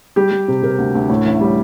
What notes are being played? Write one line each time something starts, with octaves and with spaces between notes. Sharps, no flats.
G3 G4
G3
C3
C3 A#4
D2
D2
A2
A1
G3